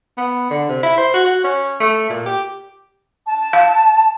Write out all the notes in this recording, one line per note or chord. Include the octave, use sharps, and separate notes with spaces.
B3
D3
C3
E4
C5
F#4
F#4
C#4
A3
A#2
G4
A5
F5